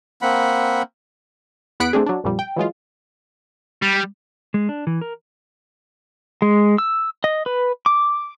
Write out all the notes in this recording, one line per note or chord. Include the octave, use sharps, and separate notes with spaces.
A#3 C4 F#5 B5
E2 B3 F#5 F#6 B6 D7
A3 C4 D4 G#4
F#3 D4
G1 F2 A#2 G3
G5
E3 F#3 G#3 F4
G3
G#3
D4
E3
A#4
G#3
E6
D#5
B4
D6